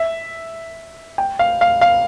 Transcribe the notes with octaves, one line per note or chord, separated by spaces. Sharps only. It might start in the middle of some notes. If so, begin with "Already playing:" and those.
Already playing: E5
G5
F5
F5
F5